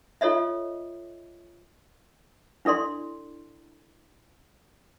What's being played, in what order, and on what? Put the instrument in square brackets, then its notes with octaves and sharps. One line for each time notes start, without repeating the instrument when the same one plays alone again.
[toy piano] F4 A4 C#5 D#5 E5
D4 E4 A4 D5 C6